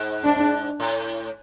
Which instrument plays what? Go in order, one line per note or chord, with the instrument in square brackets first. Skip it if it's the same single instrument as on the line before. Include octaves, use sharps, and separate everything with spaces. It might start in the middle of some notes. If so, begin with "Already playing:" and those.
Already playing: [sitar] G#2
[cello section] D4
[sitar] A2